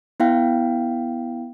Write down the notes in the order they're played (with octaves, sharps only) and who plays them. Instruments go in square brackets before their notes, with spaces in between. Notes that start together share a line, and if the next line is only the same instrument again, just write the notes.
[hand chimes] B3 E4 F5 G5